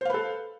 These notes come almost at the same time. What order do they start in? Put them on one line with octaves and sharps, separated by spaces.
C5 F5 B4 A4